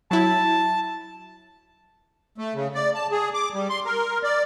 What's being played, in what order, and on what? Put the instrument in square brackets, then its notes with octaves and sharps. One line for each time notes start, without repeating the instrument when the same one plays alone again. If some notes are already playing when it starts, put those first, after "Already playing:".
[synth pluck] F#3 E4 [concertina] A5
[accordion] A3
C#3
D5
A5
G#4
D6
G3
C6
A#4
D5